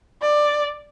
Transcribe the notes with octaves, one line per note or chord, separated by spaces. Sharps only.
D5